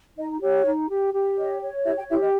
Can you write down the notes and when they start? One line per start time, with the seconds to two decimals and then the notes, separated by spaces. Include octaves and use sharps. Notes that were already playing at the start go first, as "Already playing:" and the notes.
0.17 D#4 D#5
0.41 G4 C#5
0.65 D#4
0.89 G4
1.13 G4
1.37 C#5 D#5
1.61 C#5
1.85 E4 G4 E5
1.97 G4 G5
2.09 E4 G4 E5
2.22 D#5